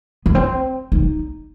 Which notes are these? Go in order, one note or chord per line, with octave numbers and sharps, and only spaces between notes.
B3
C4
D#4